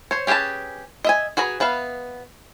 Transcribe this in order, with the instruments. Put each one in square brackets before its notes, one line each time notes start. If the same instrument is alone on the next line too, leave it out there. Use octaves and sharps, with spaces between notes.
[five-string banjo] C5 C#5
C#4 G4 G#4 B4 A5
D#5 E5 G#5
F#4 G#4 B4 A#5
B3 B4 E5 F5